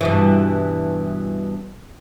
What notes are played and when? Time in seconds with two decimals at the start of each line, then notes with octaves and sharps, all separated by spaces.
0.01 G2 B2 E3